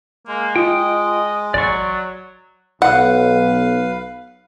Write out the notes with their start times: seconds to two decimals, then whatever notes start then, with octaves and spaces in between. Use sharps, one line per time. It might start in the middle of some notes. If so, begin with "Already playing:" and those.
0.27 G#3 A#3
0.56 F4 D#5 G5
1.54 A1 F#3 D5 C#6
2.82 B1 B4 F5 F#5